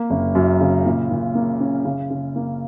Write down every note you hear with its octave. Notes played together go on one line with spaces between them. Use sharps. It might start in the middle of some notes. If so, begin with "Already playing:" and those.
Already playing: A#3
F#1
F#2
C#3
A#2
A#2
A#3
C#4
C#3
C#3
A#3